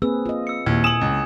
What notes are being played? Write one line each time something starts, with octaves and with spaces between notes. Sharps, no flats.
A#3 C4 G#4 B4 E6
F4 D#5
E6 C#7
D#2 A#2 A#3 E4 G#6
G#5 D#6 E6 E7 F#7
C#2